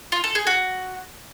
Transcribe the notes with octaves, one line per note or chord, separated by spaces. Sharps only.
F4
A4
G#4
F#4